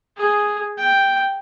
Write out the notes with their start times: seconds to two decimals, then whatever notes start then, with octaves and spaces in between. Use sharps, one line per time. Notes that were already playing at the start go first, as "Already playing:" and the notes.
0.17 G#4
0.78 G5